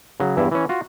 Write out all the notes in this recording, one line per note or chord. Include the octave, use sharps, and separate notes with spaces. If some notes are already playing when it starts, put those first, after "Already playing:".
C#3 F#3
E2 G2 E4
E3 C#4
F4 F#4